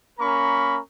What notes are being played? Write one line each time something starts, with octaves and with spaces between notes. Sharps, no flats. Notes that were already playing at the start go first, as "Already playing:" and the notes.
A#3 C#4 A#4 A#5 B5 C#6